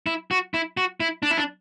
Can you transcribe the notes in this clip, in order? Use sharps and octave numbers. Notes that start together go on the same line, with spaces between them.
E4
F#4
E4
F#4
E4
D4
E4
D4